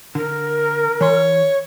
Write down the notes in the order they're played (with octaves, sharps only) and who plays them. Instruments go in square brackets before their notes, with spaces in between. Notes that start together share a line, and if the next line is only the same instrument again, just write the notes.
[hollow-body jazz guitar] D3 [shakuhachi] A#4
[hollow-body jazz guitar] E3 C6 [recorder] C#5